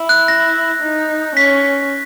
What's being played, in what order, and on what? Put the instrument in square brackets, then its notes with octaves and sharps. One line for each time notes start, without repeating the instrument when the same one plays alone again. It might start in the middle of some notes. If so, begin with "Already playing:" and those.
Already playing: [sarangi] E4
[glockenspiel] F#6
A#6
[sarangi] D#4
[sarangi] C#4 [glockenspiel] B6